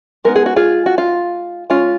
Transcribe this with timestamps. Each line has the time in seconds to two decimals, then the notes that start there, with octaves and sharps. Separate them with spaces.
0.25 G#3 B3 D#4 A#4
0.36 G#4
0.46 F#4
0.56 F4 G#4
0.86 F#4
0.98 F4
1.70 G#3 C#4 F4